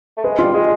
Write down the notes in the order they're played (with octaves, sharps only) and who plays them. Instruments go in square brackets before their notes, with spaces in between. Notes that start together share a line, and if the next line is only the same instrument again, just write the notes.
[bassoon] A3
[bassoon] G#3 [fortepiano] B4
[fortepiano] F4
[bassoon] G3
[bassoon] G#3 [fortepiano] G#4